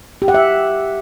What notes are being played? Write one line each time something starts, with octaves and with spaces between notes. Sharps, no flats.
G4
F#5
E5